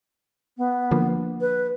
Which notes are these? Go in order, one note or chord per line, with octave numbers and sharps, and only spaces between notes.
B3
D3 F3 A#3
B4